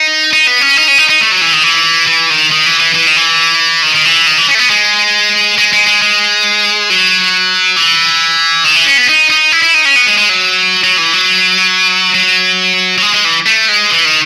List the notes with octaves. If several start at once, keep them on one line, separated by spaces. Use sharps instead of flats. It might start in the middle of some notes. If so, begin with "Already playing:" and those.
Already playing: D#4
D#4
B3
C#4
D#4
C#4
D#4
D#4
A3
F#3
E3
D#3
E3
E3
D#3
D#3
E3
E3
E3
D#3
E3
D#3
D#3
E3
D#3
E3
C#4
A3
B3
G#3
G#3
G#3
G#3
G#3
F#3
E3
D#3
E3
C#4
B3
D#4
D#4
E4
E4
D#4
C#4
B3
G#3
G#3
F#3
F#3
E3
F#3
F#3
F#3
G#3
G#3
E3
A3
G#3
E3
D#3